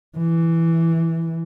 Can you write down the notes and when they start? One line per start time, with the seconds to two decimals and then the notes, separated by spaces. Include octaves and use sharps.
0.17 E3